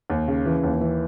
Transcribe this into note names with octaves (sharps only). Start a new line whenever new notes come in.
D#2
C#3
E3
D#2
E3